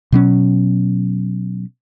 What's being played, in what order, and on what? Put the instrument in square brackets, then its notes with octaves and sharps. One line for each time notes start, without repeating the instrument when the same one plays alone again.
[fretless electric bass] B2 F#3 C#4